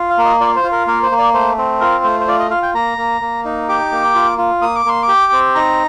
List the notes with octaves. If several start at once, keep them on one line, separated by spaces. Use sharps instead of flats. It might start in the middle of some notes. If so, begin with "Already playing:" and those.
Already playing: F4
F5
A#3
D#5
F4 D5
C5
F4
A#4
A#3 A#4
C5
A#3
D5
A3 C5
C4
F4 A#4
A3 C5
C5
F4 D5
D#5
F4 F5
G5
A#3 A#5
A#3
A#3
D#4
G4 D6
A#3
F4
F4
A#3 D#6
D6
A#3 C6
D6
G4
C4
D#4 A#5